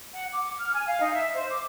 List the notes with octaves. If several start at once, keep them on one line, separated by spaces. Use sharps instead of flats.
F#5
D6
F6
G#5
F5
D#4
E5
C5
D6